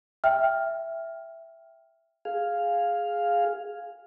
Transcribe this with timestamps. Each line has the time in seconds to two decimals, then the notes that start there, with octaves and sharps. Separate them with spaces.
0.24 E5 G5 F6
2.25 G#4 F5